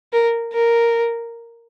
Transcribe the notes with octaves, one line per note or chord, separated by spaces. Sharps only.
A#4
A#4